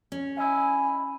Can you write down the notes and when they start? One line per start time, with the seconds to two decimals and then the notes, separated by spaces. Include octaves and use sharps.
0.12 C#4
0.37 E4 D#5 E5 G#5